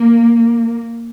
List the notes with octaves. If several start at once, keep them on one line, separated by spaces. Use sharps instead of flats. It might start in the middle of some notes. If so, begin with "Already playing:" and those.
Already playing: A#3